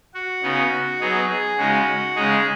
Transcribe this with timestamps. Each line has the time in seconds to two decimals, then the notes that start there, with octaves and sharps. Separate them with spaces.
0.14 F#4
0.43 C#3 B3 D#4
1.00 F#3 B3 D#4 G#4
1.29 G#4
1.58 C#3 G#3 D#4 F#4
2.15 C#3 G#3 D#4 G#4